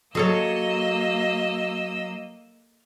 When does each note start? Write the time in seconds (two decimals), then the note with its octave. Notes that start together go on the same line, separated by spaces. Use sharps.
0.15 F#3 A#3 G#4 A4 C#5 D#5 E6